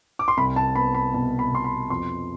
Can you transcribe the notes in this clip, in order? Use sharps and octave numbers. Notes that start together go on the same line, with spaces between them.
D6
C6
C2 B5
A5
B3 B5
B5
B2 A5
B5
B2 C6
B5
F2 C6